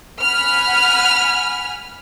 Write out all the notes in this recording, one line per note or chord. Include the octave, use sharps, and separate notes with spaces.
F#5 G#5 B5 F6